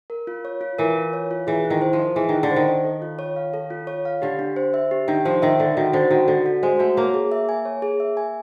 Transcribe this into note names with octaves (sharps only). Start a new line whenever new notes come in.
A#4
F4
C#5
F4
E3 A#4
F4
C#5
F4
E3 G#4
E4
D#3
C5
F3
D#5
E3 G#4
D#3 E4
D3
C5
D#3
D#5
A4
F4
C#5
F5
A4
F4
C#5
F5
D3 G4
D4
C5
E5
G4
D#3 D4
F3 C5
D#3 E5
D3 A4
D#3 F#4
D3 C5
D#3 F#4
D3 A4
F#4
G#3 C5
A3 F#4
A#3 C#5
G#4
E5
G#5
C#5
G#4
E5
G#5